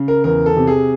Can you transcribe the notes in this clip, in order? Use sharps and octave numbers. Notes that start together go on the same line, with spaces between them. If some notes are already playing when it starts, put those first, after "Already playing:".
Already playing: C#3
A#4
E2 A#4
A4
C3
G#4